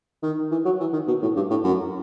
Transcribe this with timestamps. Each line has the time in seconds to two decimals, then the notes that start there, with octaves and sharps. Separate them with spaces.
0.23 D#3
0.51 E3
0.65 F#3
0.80 E3
0.93 D#3
1.07 B2
1.22 A2
1.36 G2
1.50 A2
1.64 F#2